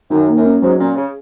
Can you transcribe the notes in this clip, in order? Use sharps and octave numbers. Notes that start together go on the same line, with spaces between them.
F#2 D#3
A#3
F#2
C#4
G#2 F#3
A#2 C#4
C#3